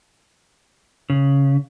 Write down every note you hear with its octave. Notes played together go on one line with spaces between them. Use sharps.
C#3